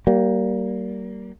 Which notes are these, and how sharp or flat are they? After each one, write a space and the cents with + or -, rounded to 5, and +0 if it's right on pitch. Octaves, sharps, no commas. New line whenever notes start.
G3 -30 A#3 +0